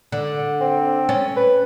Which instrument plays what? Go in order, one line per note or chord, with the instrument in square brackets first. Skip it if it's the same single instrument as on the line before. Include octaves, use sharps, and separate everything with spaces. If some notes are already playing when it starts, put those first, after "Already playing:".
[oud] D3
[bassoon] C4
[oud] C#4
[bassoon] B4